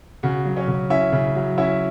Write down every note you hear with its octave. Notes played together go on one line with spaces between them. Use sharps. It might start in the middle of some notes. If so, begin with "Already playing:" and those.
C#3 F#4
F#3
C#4 C#5
C#3
C#4 E4 E5
C#3
F#3
C#4 E4 E5